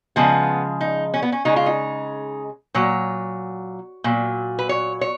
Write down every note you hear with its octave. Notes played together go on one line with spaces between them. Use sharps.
C#3 F3 G#3 B3
D#4
C#4
B3
C#4
C#3 G#3 D#4
F4
D#4
A#2 F#3 C#5
A#2 F#3
B4
C#5
C#5